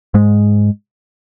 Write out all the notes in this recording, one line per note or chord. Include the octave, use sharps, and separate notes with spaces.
G#2 G#3